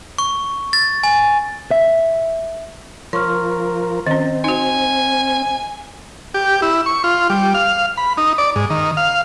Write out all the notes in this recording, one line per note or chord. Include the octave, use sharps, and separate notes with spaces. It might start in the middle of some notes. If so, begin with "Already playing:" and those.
C#6
A6
G#5
E5
F3 A#4 C#5 C6 C#6 F6
D#3 C4 C#4 D#5
D#4 F#4 G#5
G4
E4
C#6
F4
G3
F5
B5
D#4
D5
G#2
D#3
F5